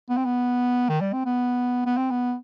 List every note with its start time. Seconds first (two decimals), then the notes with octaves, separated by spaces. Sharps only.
0.09 B3
0.17 C4
0.25 B3
0.89 D#3
1.01 G3
1.13 C4
1.25 B3
1.86 B3
1.98 C4
2.11 B3